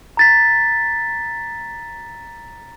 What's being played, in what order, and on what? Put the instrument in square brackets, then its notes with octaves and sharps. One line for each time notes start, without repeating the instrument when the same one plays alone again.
[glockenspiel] A#5 A6 B6